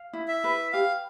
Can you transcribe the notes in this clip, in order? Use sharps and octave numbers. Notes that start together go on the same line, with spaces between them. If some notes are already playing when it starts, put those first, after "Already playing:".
Already playing: F5
E4
E5
B4
G4 F5